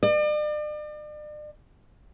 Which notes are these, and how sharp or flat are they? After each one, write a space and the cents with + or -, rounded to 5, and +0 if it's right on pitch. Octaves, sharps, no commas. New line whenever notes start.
D5 +40